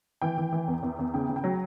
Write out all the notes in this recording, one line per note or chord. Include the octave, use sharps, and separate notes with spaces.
E3 G5
E3
E3
E2
E2
E2
C#3 G5
C#3
G5
F#3